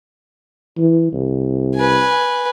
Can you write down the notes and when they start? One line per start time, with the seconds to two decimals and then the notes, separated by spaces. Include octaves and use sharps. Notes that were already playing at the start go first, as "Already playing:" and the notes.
0.78 E3
1.13 C2
1.75 B4 G#5